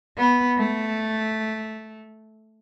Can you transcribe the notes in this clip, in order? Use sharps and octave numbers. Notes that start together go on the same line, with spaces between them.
B3
A3